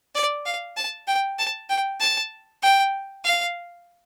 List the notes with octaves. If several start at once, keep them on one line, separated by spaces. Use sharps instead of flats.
D5
F5
A5
G5
A5
G5
A5
G5
F5